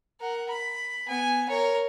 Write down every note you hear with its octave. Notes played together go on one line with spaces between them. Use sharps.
A#4 F#5
B5
B3 G#5
A#4 C#5